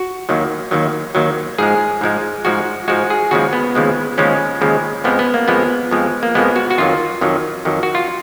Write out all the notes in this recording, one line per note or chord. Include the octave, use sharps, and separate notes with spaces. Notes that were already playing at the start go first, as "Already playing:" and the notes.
Already playing: F#4
D#2 D#3 F#3
D#2 D#3 F#3
D#2 D#3 F#3
G#2 F3 G#3 G#4
G#2 F3 G#3
G#2 F3 G#3 F#4
G#2 F3 G#3 F#4
G#4
D#2 C#3 F3 G#3 F#4
B3
D#2 C#3 F3 G#3
D#2 C#3 F3 G#3 C#4
D#2 C#3 F3 G#3
F2 F3 G#3 B3
B3
A#3
F2 F3 G#3 B3
F2 F3 G#3
A#3
F2 F3 G#3 B3
F#4
F#4
F2 D#3 F#3 F4
F2 D#3 F#3
F2 D#3 F#3
F#4
F4